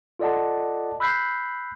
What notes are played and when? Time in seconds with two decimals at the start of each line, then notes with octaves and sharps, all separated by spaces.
0.19 F4 A4 D5 D#5 F#5 A5
1.00 B5 E6 F#6 G6 B6 C7